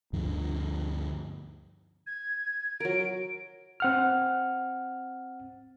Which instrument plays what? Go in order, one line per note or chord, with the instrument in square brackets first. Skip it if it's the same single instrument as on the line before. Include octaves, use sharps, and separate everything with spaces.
[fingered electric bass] D2 G2 D3 F3
[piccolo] G#6
[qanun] F#3 A#4 [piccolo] D7
[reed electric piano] C4 F#5 F6